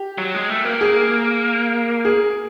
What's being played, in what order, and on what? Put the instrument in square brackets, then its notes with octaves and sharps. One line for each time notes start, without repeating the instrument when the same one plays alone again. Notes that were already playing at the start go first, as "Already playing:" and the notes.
Already playing: [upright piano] G4
[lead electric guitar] F#3
G#3
A3
A#3
[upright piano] G#4
G#4